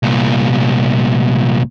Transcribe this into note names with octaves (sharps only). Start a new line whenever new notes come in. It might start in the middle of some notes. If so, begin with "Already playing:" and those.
C2 A#2